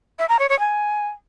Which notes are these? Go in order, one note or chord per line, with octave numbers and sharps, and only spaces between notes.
E5
A#5
C#5
C#5
G#5